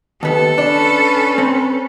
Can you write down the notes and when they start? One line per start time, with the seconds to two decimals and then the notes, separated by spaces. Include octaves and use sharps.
0.23 D#2 B3 A4
0.58 C#4 D4 B4
1.38 C4